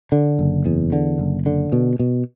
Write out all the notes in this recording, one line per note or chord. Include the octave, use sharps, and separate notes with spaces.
D3
F#1
E2
D3
F#1
D3
B2
B2